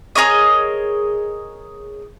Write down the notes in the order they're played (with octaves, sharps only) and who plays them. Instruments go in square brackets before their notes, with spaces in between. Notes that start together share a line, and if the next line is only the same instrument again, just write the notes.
[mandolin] G#4 A#4 C#5 D#5